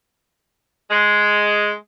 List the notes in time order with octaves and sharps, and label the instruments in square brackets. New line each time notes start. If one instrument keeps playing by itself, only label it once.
[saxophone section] G#3